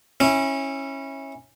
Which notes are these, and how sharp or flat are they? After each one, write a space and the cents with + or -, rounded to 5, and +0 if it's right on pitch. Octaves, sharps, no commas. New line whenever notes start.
C#4 -20 E4 -15